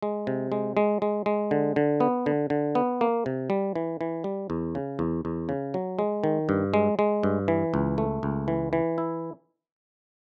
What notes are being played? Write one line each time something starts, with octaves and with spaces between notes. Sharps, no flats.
G#3
C3
G#3
G#3
G#3
G#3
D3
D3
B3
D3
D3
B3
A#3
C3
G3
E3
E3
G3
E2
C#3
E2
E2
C#3
F#3
G#3
D#3
G2
G#3
G#3
G2
E3
C#2
A3
C#2
E3
E3
E4